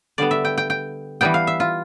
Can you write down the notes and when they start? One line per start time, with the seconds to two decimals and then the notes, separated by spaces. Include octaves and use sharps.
0.18 D3 G3 B3 D5
0.31 E5
0.45 G5
0.58 G5
0.70 G5
1.21 E3 G3 B3 G5
1.34 F5
1.47 E5
1.60 F4